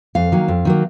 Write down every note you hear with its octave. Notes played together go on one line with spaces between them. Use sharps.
F2 F5
D#3 F#3 A#3
F2
D#3 F#3 A#3